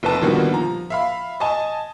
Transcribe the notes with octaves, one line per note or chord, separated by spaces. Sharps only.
F1 B4 A5
A#2 D3 D#3 G3 B3 F#4
F3 A#5
E5 F5 B5
D#5 G#5 A5